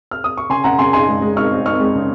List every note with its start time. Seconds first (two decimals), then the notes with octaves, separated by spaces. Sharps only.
0.11 F6
0.24 D#6
0.38 C#6
0.50 C#3 G#5 C6
0.64 C#3 F#5 A#5
0.79 C#3 G#5 C6
0.93 D#4 G#5 C6
1.08 G#3
1.22 G#3
1.36 D#4 C#6 F6
1.51 C4
1.66 D#4 C#6 F6
1.80 G#3
1.95 C#3